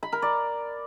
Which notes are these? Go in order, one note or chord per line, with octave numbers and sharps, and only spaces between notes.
B5
A#4
D5